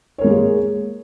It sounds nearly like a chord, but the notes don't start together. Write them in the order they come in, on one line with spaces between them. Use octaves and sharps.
C#5 A#4 G#3 A#3 G#4